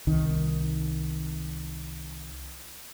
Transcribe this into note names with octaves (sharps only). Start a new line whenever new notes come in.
C2 D#3